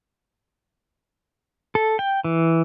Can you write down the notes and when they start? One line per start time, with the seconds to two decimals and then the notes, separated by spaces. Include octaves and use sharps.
1.75 A4
1.99 G5
2.24 E3